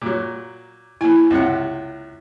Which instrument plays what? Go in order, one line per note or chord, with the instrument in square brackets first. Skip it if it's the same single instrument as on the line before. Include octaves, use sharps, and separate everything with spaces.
[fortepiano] A#2 F#3
[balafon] A#3 E4 [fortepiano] G#5
[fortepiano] C#2 C3 F#5